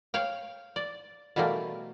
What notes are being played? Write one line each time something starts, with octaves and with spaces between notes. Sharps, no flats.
C#5 F5 G5
D5
B2 E3 G3 A3 A#3